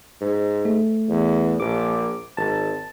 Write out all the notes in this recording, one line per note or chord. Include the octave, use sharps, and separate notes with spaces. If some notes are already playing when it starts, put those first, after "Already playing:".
G#2
A3
E2
A#1 D6
G#1 A5